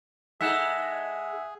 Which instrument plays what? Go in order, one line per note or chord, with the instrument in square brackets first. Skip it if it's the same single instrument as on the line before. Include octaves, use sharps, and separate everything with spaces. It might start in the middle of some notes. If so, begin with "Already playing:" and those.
[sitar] G#3 D#4 A4 [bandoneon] G#4 [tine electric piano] E5 F#5 E6